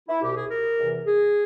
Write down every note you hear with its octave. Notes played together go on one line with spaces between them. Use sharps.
E4
C2 B2 G4
G#4
A#4
E2 C3 E3
G#4